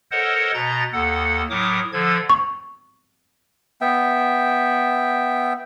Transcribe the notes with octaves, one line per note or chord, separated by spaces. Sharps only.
A4 A#4 C5 C#5 D#5 F#5
B2 D#5 A#5 A6
D#2 A4 F#5
A2 F#3 A#4 D6 D#6
D3 F3 A4 G#6
C#6
B3 E5 G5